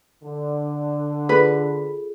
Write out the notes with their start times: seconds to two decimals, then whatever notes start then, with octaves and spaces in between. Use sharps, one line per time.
0.23 D3
1.29 F4 G#4 A4 B4